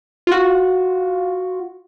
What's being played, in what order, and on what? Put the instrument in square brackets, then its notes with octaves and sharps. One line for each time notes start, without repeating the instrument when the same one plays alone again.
[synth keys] F4 F#4